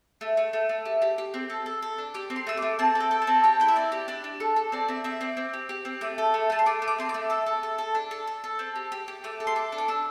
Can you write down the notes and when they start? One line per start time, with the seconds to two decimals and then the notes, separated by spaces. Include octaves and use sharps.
0.21 A3
0.37 A3
0.53 A3
0.69 A3
0.85 G4
1.02 G4
1.18 G4
1.34 C4
1.50 A4
1.66 A4
1.82 A4
1.98 D4
2.14 G4 D6
2.30 C4
2.36 C6
2.47 A3 E6
2.57 A3 D6
2.79 C4 A5
2.95 A4
3.00 G5
3.11 A4
3.22 A5
3.27 C4
3.44 G4 G5
3.60 E4 G5
3.68 E5
3.76 C4 D5
3.92 G4
4.08 D4 D5
4.24 D4
4.40 A4
4.56 A4
4.72 C4 D5
4.88 C4 E5
5.04 C4 E5
5.21 C4 D6
5.37 C4
5.53 G4
5.69 G4
5.85 C4
6.01 A3 D6
6.18 A4
6.34 A3
6.50 A3 A5
6.59 C6
6.66 A3 D6
6.82 A3
6.88 D6
6.98 C4 C6
7.09 D6
7.14 A3
7.30 A4 E6
7.46 A4
7.63 A4
7.78 A4
7.95 D4
8.11 A4
8.27 A4
8.44 A4
8.59 C4
8.76 G4
8.92 G4
9.08 G4
9.24 A3 D6
9.40 A4
9.47 C6
9.56 A4 D6
9.72 D4
9.78 D6
9.88 D4 E6